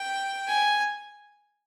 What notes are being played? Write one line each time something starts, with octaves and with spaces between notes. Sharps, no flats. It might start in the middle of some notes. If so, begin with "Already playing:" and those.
Already playing: G5
G#5